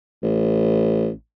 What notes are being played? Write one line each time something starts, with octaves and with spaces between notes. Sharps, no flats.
A1